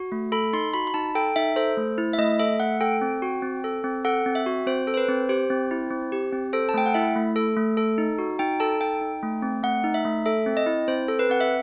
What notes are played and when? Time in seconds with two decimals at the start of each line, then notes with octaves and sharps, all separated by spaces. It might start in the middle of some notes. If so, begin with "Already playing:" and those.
Already playing: F#4
0.12 A3
0.32 A4 B5
0.53 D#4 C6
0.74 F#4 B5
0.87 B5
0.94 D#4 A5
1.15 A4 G5
1.36 D#4 E5
1.56 A4 C5
1.77 A3
1.98 E4
2.13 E5
2.18 A3 D#5
2.39 A4 E5
2.60 A3 F#5
2.81 A4 G5
3.01 C4
3.22 F#4
3.42 C4
3.64 A4
3.84 C4
4.05 A4 F#5
4.26 C4
4.35 E5
4.46 F#4
4.66 C4 C5
4.87 A4
4.94 C5
4.97 B4
5.09 C4
5.29 G4 C5
5.50 C4
5.71 E4
5.91 C4
6.12 G4
6.33 C4
6.53 A4 C5
6.69 A5
6.74 A3 G5
6.86 F#5
6.94 E4 E5
7.16 A3
7.36 A4
7.57 A3
7.77 A4
7.98 D#4
8.18 F#4
8.39 D#4 G5
8.60 A4 A5
8.81 D#4 G5
9.01 D#4
9.23 A3
9.42 C4
9.63 A3 F#5
9.84 D#4
9.94 E5
10.05 A3
10.26 A4 E5
10.46 C4
10.57 D#5
10.66 E4
10.88 C4 C5
11.08 A4
11.19 B4
11.29 C4 F#5
11.40 E5